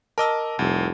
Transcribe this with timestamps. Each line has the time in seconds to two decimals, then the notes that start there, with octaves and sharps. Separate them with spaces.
0.18 A#4 D#5 A5 D6 E6
0.59 F1 C2